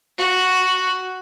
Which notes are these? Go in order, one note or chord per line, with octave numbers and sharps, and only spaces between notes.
F#4